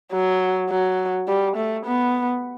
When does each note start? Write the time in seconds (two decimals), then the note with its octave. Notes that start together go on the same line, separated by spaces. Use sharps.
0.12 F#3
0.69 F#3
1.28 G3
1.56 A3
1.86 B3